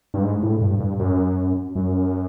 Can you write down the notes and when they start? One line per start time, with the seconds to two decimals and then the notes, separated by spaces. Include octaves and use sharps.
0.14 G2
0.23 G#2
0.43 A2
0.61 G2
0.80 G2
0.99 F#2
1.75 F#2